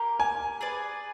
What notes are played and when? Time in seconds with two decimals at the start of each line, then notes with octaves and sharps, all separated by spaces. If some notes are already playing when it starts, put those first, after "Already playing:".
Already playing: A#3 G4 A#4
0.20 G#5
0.61 G#4 B4 D5